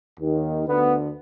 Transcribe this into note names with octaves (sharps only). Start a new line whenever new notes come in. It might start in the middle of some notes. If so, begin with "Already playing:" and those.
D#2 D#3
D2 D3 B3